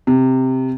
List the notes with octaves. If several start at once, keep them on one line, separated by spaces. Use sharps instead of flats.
C3